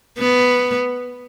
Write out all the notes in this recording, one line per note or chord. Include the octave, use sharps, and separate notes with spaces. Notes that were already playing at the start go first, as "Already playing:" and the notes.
B3